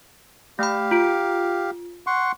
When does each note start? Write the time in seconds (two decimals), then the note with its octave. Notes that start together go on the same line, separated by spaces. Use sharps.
0.59 A3 G4 F5 B5
0.91 F4 D7
2.07 F#5 C6 C#6